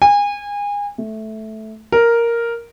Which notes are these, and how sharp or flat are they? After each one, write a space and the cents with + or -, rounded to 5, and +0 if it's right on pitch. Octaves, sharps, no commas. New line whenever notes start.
G#5 -30
A3 -10
A#4 +0